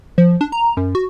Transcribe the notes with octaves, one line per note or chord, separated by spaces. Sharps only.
F3
D4
A#5
F#2
F#4